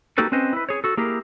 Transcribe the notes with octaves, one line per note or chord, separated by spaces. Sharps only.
A#3 D#4 F#4 G4 A4 B4
C4 C#4 B4 C5 D#5
E4 B4
G#4 C#5
F#4 A4
A#3 E4 G4 G#4 A#4